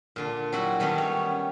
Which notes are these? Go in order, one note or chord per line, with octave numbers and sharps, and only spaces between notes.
A#2 D3 D4
F#3 G3 E4 F#4 F#5
D#3 G3 A3 B3 C#4
C#5